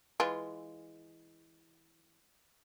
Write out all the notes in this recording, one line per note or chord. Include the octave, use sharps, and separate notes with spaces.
E3 G#3 F4